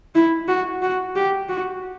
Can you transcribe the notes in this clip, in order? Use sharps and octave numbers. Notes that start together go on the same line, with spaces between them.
E4
F#4
F#4
G4
F#4